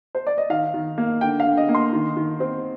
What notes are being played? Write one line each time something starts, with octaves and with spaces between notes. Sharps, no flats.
C5
D5
D#5
D#3 F5
D#3
A#3
D3 G5
F5
D3
D#5
A#3
C6
D#3
D#3
C4